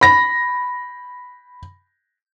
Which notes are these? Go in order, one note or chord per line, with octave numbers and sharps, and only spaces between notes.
B5 A#6